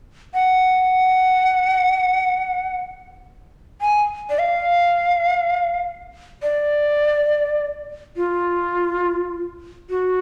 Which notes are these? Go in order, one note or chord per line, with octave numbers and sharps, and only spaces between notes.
F#5
G#5
D5
F5
D5
F4
F#4